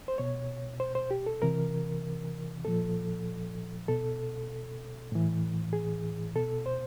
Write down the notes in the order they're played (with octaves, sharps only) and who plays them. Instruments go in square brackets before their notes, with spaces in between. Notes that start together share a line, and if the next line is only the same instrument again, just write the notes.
[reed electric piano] C5
B2 C#5
C5
C5
G4
A4
C3 E3 A#4
A#2 F3 A4
B2 A4
A2 E3
G#4
B2 A4
C5